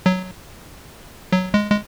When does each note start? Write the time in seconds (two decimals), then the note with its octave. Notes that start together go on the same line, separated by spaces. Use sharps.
0.06 F#3
1.32 F#3
1.54 G#3
1.71 G#3